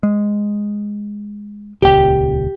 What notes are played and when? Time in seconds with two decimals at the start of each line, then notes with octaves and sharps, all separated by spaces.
0.03 G#3
1.82 D#1 C#2 G4 G5